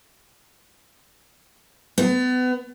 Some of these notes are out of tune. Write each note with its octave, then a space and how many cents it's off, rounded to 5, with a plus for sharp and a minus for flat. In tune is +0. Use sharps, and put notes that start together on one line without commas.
B3 +30